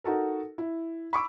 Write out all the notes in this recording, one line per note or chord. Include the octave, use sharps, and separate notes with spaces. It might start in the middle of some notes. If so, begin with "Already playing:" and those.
D#4 F#4 A4 A#4
E4
B5 C#6 D6 E6